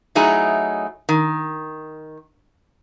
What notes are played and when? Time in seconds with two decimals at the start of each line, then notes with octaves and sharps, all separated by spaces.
0.15 F#3 A3 D#4 E4 G#4
1.09 D#3